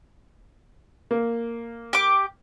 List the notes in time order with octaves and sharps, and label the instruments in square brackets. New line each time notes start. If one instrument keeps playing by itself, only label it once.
[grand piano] A#3
[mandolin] G4 D6